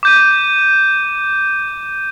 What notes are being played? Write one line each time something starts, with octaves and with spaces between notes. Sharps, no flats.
D6 G6 D#7